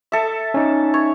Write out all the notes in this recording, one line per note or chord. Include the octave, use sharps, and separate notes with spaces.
A4 E5
C#4 D#4
C#5